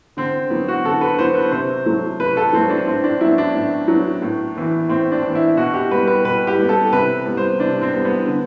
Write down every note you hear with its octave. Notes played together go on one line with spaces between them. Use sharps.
D3 C4
F#3 B3
F#4
D3 A4
B4
F#3 B3 C5
B4
C3 C5
F#3 A3
C3 B4
A4
F#3 A3 C4
D4
A2 C4
D4
F#3 B3 E4
D4
A2
F#3 B3
A2
E3 B3
A2 C4
D4
E3 B3
E4
B2 F#4
G4
G3 B3 B4
B4
B2 B4
G4
G3 B3
A4
C3 B4
G3 B3
C5
C3 D4
C4
G3 B3
B3
D3